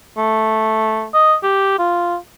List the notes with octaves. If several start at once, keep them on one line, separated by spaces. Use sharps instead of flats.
A3
D#5
G4
F4